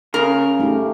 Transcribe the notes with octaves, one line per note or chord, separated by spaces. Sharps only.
C#3 A#4
A3 D#4 G4